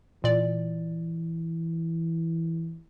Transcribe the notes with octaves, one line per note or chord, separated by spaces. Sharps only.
A#2 E3 D5